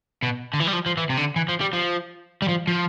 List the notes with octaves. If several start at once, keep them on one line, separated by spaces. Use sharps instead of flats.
B2
D3
E3
G3
F3
F3
E3
C3
D3
E3
F3
G3
F3
G3
F3
F3